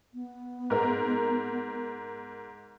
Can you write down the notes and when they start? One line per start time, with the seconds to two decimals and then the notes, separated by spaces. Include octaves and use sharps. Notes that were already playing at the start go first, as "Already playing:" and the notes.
0.14 B3
0.70 G#2 A#4